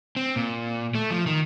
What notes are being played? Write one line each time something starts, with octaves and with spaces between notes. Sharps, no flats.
C4
A#2
A3
F3
D#3